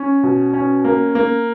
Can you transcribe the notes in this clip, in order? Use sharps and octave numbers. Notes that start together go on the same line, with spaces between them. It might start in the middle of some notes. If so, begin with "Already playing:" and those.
Already playing: C#4
B2
C#4
A#3
A#3